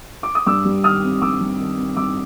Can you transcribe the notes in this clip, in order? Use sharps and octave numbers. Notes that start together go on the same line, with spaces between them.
D6
D#6
G2 D6 E6
G3
D#3 D#6 F6
C4
G2 D6 E6
G3
D#3
C4
G2 D6 E6